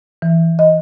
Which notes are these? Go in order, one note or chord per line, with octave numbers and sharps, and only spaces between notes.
E3
D#5